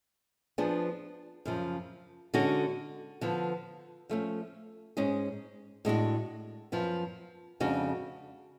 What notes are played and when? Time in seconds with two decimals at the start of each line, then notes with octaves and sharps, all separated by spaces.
0.58 F3 B3 D4 G#4
1.45 F#2 C#3 F3
2.34 D3 G#3 C#4 F#4
3.21 D3 F3 B3
4.09 F3 A3 C#4
4.97 G#2 G#3 C#4 G#4
5.85 A2 G#3 D4 F#4
6.72 F#2 F3 B3
7.60 F2 C#3 G#3 D4 F#4